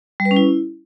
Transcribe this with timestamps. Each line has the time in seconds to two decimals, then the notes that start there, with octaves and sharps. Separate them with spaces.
0.20 G3
0.25 B4
0.31 C#4
0.36 E4